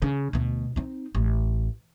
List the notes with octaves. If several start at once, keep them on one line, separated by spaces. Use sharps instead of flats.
C#3
D2 B2
C4 D#4
A1